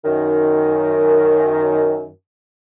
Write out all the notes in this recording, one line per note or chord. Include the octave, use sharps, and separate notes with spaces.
F#2 D#3